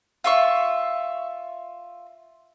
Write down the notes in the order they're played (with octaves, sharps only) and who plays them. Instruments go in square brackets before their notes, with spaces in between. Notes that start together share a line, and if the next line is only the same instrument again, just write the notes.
[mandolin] F4 E5 C#6